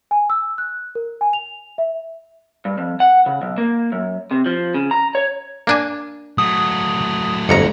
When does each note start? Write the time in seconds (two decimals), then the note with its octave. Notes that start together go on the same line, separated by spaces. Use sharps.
0.11 G#5
0.30 E6
0.58 F#6
0.95 A#4
1.21 G#5
1.33 F7
1.78 E5
2.65 G2
2.78 F2
3.00 F#5
3.26 C#3
3.42 B1
3.58 A#3
3.92 F#2
4.31 C3
4.46 F3
4.74 C#3
4.91 A#5
5.15 C#5
5.67 A#3 D4 G#5
6.38 F#3 A3 D#6
7.49 G1 F2 A#5 C#7